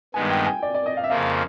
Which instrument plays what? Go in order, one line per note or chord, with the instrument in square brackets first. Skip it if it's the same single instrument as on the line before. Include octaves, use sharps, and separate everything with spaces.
[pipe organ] G2 D#3 G#3 B3 [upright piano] G#5
[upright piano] G5
G#5
D5
D5
D#5
F5
E5
[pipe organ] F2 C#3 F3 A#3 [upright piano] F5